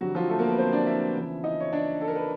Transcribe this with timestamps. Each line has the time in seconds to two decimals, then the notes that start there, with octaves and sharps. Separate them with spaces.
0.01 F2 D3 F#3 G3 F#4
0.15 F3 F4
0.29 A3 A4
0.39 A#3 A#4
0.48 B3 B4
0.58 C4 C5
0.73 D4 D5
0.87 E4 E5
1.15 E2 C#3 F3
1.44 D#4 D#5
1.60 C#5
1.73 D4 D5
2.01 A4
2.08 A#4
2.15 B4